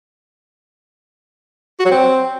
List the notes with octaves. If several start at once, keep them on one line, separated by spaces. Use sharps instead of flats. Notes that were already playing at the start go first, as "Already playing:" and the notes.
F#4
F#3
C4